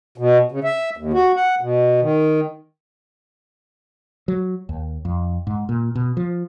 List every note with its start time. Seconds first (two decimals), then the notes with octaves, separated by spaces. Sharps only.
0.18 B2
0.52 C#3
0.64 E5
0.97 D#2
1.13 F#4
1.36 F#5
1.61 B2
2.02 D#3
4.28 F#3
4.69 D#2
5.05 F2
5.47 G#2
5.69 A#2
5.95 B2
6.17 F3